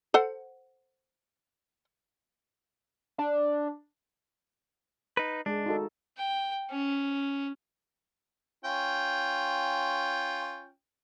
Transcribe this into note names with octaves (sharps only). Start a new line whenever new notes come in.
A4 C5 F#5
D4
D#4 B4
G#3 D4 G#4
D#4 F#4 A4
G5
C#4
C#4 F4 G5